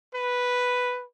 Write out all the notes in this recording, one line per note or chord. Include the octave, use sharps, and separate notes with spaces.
B4